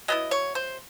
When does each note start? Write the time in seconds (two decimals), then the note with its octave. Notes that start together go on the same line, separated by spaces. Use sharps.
0.08 F#3 B3 E4 D#5
0.31 C#5
0.55 C5